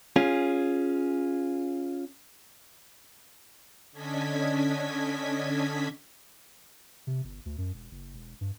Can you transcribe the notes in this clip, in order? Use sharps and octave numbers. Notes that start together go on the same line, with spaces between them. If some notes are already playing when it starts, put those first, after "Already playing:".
C#4 F4 G#4
D3 C#4 D4 D#5 G#6 B6
C3
G1
D2
F#2
E1
F#1
E1
G2